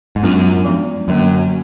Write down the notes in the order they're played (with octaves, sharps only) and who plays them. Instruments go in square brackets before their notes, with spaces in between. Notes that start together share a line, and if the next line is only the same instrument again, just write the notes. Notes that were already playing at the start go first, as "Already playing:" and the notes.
[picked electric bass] G#2
[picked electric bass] F#2 [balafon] B3 D4 F4
[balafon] F3 G#3 B3 D4
[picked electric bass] F#2 [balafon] D3 F#3 A#3